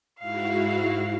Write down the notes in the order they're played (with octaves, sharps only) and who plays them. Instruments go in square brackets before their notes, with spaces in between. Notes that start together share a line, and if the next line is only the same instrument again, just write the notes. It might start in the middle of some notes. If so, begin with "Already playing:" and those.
[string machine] G#2 E4 F#4 [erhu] F5